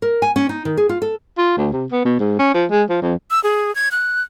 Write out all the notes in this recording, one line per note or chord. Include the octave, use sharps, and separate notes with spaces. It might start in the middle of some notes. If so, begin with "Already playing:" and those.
A#4
G#5
C#4
D#4
D#3
G#4
F4
A4
F4
D2
C3
B3
B2
G#2
C#4
F3
G#3
F3
F2
E6
G#4
G#6
F#6